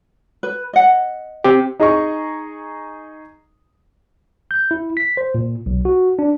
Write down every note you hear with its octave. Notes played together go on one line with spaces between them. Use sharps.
B4
D#5 F#5
C4 G4
D#4 G#4 D#5 A#5 C#6
G6
E4
B6
C5
A#2
B1
F#4
D4